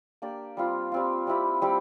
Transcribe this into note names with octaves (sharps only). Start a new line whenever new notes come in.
A#3 D4 G4 D5
G3 C4 F4
G3 C4 F4
G3 C4 E4 G4
G3 C4 E4 G4